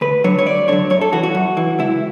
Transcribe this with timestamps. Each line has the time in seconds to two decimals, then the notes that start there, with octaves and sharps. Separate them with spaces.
0.01 D2 B4
0.24 D3 F#3 C#5
0.39 C#5
0.46 D2 D5
0.68 D3 F#3 C#5
0.90 F#2 C#5
1.01 A4
1.13 E3 F#4
1.24 F#4
1.35 F#2
1.57 E3
1.79 C#2 E4